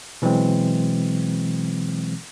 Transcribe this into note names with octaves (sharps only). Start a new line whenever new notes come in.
B2 E3 F#3 G#3 C4